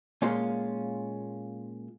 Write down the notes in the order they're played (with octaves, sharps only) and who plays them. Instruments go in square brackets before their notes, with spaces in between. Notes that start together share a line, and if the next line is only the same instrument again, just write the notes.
[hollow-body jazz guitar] A#2 G#3 C#4 F4